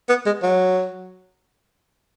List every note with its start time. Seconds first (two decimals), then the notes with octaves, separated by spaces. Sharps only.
0.09 B3
0.26 G#3
0.42 F#3